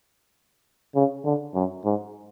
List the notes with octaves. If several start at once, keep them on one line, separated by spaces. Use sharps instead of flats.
C#3
D3
F#2
G#2